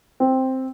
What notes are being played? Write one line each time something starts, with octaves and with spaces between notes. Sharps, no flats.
C4